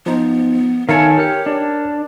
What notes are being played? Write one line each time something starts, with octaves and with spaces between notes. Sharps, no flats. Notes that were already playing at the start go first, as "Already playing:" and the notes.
F3 B3 D#4 C5
D#3 A4 A#4 C#5 E5 F5 G#5
G4 A#4 F6 C#7
D4